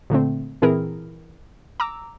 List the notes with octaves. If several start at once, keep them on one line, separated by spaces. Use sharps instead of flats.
A#2 D3 A3 C4
A#2 E3 C4 E4 G#4 A#4
A#5 D6 E6